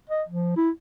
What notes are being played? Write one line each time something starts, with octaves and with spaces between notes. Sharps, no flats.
D#5
F3
E4